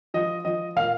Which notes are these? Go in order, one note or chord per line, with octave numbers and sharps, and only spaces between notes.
F3 D#5
F3 D#5
A#2 F5